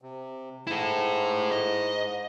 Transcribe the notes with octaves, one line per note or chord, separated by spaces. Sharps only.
C3
G#2 E4 A4
D#5